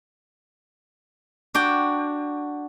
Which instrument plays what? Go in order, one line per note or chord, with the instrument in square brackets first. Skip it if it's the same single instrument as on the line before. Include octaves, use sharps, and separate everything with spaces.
[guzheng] D4 F#4 G5